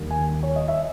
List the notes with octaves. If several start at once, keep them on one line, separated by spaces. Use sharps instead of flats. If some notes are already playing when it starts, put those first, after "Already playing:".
Already playing: D#2 D#3 G3 A#3
G#5
C#5
D#5
E5